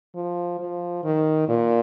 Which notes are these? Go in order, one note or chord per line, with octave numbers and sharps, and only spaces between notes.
F3
F3
D#3
A#2